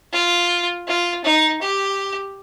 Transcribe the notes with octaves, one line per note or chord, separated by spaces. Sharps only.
F4
F4
D#4
G4